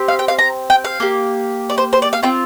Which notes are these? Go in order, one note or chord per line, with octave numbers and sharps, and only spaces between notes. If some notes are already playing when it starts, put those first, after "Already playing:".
Already playing: C4 G4
F5
G5
F5
A#5
G5
F5
A#3 G4
D5
C5
C5
D5
F5
C4 F4 G5